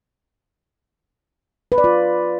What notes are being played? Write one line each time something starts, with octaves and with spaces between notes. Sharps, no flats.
B4
D5
F4